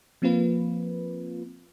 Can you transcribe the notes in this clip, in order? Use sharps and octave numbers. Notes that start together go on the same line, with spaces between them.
F3 A#3 C4 F4 B4